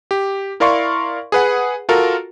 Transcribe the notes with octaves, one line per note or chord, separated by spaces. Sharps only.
G4
E4 A#4 D5 F5 C6 C#6
G#4 B4 F#5
F4 F#4 A4 A#4